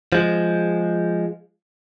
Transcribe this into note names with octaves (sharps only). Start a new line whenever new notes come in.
F3 G#3